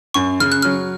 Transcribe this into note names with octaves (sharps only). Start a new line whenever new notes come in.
F#2 C#6
C#3 F6
F#6
F#3 F6